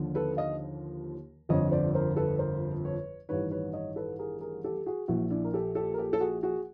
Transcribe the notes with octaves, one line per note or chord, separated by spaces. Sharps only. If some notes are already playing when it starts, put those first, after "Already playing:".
Already playing: D#2 D3 F3
A4 B4
D#5 F5
G1 F2 D3 F3 C#5 D#5
C5 D5
A#4 C5
A4 B4
A#4 C5
B4 C#5
A1 G2 D#3 B4 C#5
B4 C#5
C#5 D#5
A4 B4
G#4 A#4
G#4 A#4
G4 A4
F#4 G#4
A#1 A#2 F3 E4 F#4
D4 E4
A#4
G4 A4
G4 A4
A#4
G4 A4
A4
F#4 G#4
F#4 G#4